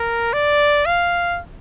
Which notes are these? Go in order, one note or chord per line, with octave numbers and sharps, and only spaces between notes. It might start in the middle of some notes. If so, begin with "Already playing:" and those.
Already playing: A#4
D5
F5